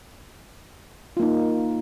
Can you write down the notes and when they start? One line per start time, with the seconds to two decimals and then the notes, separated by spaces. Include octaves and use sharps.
1.17 F4
1.20 A#3
1.22 D#4